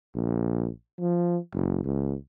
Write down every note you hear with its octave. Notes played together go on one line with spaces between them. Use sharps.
A#1
F3
F#1
C#2